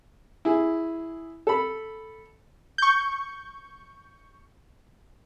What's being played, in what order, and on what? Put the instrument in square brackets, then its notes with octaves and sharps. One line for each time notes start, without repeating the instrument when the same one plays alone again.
[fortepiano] E4 G#4
A4 B5
[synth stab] C#6 G6